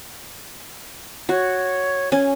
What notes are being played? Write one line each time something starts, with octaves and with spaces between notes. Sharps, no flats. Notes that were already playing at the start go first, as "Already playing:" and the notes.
F#4 C#5
C#4 G#5